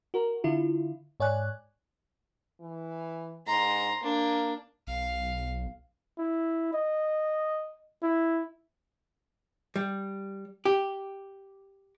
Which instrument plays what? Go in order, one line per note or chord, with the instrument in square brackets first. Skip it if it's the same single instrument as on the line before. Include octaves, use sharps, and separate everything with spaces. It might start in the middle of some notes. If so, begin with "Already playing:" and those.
[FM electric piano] F#4 A#4
D3 E4 F4
G#2 C#5 D5 G#5 F#6
[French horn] E3
[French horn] G#2 [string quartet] A#5 C6
[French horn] A#3 [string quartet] D4
[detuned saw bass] B1 [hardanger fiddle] F5
[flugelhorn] E4
D#5
E4
[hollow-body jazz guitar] G3
G4